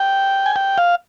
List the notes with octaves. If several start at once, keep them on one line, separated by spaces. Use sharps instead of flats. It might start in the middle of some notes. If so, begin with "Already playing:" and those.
Already playing: G5
G#5
G5
F5